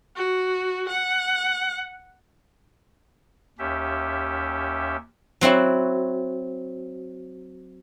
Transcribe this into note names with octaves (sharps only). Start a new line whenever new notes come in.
F#4
F#5
D#2 C#4 G4 E5
F#3 C4 E4 F#4